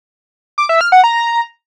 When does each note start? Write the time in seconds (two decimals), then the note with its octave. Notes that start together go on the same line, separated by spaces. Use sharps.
0.58 D6
0.69 E5
0.81 F6
0.92 F#5
1.04 A#5